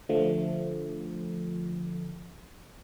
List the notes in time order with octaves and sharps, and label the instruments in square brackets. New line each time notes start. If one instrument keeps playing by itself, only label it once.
[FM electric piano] D3 F3 A3